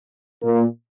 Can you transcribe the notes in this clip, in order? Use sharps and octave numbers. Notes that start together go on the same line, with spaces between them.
A#2 A#3